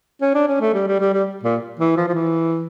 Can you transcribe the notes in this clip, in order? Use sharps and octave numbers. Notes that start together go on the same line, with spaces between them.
C#4
D4
C#4
A3
G3
G3
G3
G3
A#2
E3
F3
F3
E3